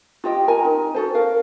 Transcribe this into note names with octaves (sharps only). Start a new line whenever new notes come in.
F4 G4 D#5 G5
A#4 G#5 A#5
D#4
F#4 A4 C5
A#4 F5